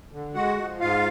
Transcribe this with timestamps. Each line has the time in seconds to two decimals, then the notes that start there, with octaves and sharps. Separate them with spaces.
0.12 D3
0.34 G#3 F#4 F#5
0.57 F3
0.80 G#2 F4 F5